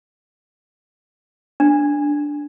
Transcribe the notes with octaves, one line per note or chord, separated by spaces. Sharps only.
D4